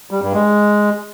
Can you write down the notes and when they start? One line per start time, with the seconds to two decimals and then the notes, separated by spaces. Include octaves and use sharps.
0.11 G3
0.22 G2
0.33 G#3